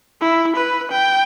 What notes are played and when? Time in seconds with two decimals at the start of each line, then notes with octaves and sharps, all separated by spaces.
0.21 E4
0.56 B4
0.92 G5